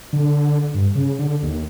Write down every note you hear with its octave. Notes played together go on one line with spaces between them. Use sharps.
D3
G2
C#3
D3
D#2